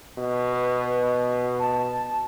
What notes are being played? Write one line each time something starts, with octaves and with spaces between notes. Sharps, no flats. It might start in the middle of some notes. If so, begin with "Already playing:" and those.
B2
B4
A5